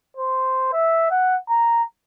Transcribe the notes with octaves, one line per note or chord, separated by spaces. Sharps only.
C5
E5
F#5
A#5